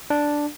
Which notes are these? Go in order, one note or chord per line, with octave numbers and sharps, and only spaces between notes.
D4